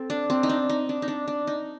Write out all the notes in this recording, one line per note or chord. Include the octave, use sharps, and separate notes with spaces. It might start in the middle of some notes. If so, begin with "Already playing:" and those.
Already playing: C4 A4
D4
C4
D#4
D4
D#4
D4
D#4
D4
D4
D#4